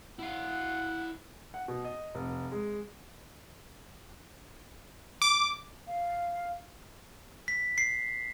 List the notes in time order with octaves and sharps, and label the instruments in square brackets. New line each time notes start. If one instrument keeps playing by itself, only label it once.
[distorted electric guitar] E4 F5 [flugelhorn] F#5
[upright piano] F#5
B2
D#5
F1
G#3
[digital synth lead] D6
[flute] F5
[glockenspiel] B6
C7